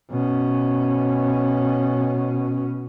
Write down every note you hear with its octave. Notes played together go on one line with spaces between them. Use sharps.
B2 C#4